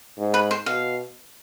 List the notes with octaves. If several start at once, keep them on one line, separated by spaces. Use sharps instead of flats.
G#2
B4
C5
B2 F5